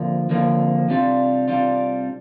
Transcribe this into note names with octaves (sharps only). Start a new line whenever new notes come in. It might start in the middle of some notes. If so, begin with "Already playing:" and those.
Already playing: D2 D3 F3 A#3
D2 D3 F3 A#3
C2 C3 G3 D4 F4
C2 C3 G3 D4 F4